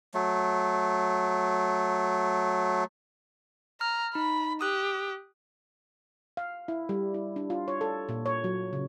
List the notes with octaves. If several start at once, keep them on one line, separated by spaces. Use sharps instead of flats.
F#3 A3
A#5 F6
D#4 B5
G4 D#6 F#6
F5
E4
G3
E4
D4
F4
C#5
A4
A#2
C#5
F#3
C#3